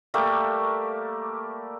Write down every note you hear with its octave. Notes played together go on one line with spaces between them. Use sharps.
G3 A3 A#3 E5